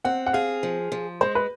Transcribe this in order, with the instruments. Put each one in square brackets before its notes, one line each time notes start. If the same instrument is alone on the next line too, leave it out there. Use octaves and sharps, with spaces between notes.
[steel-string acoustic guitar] C4 [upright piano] F#5
[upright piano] F#5
[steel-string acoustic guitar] G#4 [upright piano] F5
[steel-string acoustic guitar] F3
F3
[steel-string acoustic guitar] G#3 [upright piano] C5
[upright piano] B4